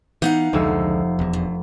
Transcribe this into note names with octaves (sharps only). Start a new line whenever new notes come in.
E3 B3 D#4 F5 F#5
F1 C#2 D3 G#3 E6
E1 E2
G2